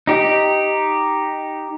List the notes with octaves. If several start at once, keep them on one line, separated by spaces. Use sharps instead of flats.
D#4 G4